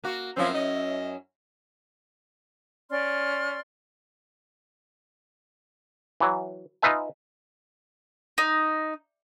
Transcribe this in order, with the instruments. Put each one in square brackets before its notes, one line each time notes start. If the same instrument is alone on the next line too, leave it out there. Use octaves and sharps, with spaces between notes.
[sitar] A#3 F#4
[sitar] F#2 C#4 E4 [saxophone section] F3 A#3 C4
[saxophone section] D#5
[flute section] C#4 D5 C6 F6
[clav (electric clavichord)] E3 F#3
D#4 F4 B4 E5 G#5
[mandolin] D#4